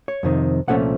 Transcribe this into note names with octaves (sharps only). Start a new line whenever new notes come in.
C#5
F2 C3 D#3
C2 A#2 F3 A3 C#4 F#5